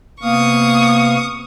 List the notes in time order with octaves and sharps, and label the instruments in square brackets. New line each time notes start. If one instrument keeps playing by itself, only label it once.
[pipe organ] C3 B3 F5 [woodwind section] A#3 [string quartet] C#6 D#6